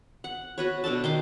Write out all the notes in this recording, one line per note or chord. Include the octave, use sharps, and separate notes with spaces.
F#5
F#4 B4 C#5
B2 D4 A4 A5
D#3 C6 D6